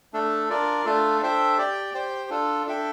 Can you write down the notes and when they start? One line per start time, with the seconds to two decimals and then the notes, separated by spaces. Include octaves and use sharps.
0.13 A3 D4 A4
0.49 D4 F4 A#4 D5
0.85 A3 D4 F4 A4
1.21 D4 A4 C5 E5 G5
1.58 G4 D5 G5
1.94 G4 C5 G5
2.30 D4 F4 A4
2.66 D4 A4 E5 G5